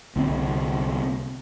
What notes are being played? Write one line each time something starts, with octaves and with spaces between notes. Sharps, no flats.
C2 D3 A#3 C4